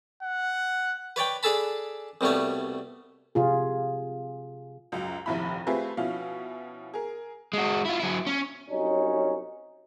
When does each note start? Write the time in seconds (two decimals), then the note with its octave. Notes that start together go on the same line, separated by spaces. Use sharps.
0.22 F#5
1.16 B4 C#5 D5 G5
1.43 D4 G#4 A4 A5 B5
2.21 C2 B2 G3 A3 C#5
3.35 C3 F4 G#4
4.92 C#2 F#2
5.26 F1 A#1 D#2 E4 B5
5.67 A3 C4 F4 G4 G#4 B4
5.97 B2 F3 C#4 E4 F5
6.94 G#4 A#4
7.53 G#3 F#4
7.85 E4 F4
8.00 F#3 E4
8.27 C#4
8.68 C2 F#3 C#4 D#4